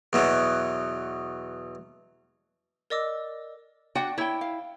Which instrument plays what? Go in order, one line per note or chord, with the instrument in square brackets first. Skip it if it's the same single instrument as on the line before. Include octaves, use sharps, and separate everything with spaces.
[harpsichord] E2 B2 F#3
[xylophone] A#4 D5 D#5 D6 E6
[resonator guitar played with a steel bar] D4 F#4 F#5 [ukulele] G5
[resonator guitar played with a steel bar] E4 G5 [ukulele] C#5
[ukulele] F5